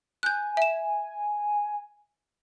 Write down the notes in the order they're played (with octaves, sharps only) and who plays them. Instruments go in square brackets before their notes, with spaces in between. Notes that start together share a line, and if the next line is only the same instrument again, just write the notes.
[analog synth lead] G#5 [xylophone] F#6 G6
[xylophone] E5 E7